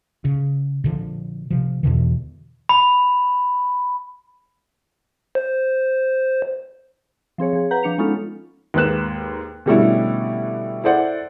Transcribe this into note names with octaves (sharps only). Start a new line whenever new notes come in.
C#3
A#2 D3 F3
C3 F3
E2 B2 D3 E3
B5
C5
F3 C4 G#4 C#5
F3 G#4
B4 F#5 A#5 G6
F3 D4 C#7 F7
G#3 B3 C#4 D#4 F4 A4
D#2 G#2 A#3 B4 F#6 E7
B2 D3 G3 A3 C#4 E4
E4 A4 C5 D5 F#5